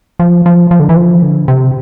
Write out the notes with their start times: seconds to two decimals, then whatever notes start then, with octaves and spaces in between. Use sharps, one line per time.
0.19 F3
0.46 F3
0.71 F3
0.80 D3
0.89 E3
0.96 F3
1.22 D3
1.48 C3